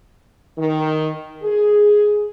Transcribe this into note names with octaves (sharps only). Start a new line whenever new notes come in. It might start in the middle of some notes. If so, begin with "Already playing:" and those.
D#3
G#4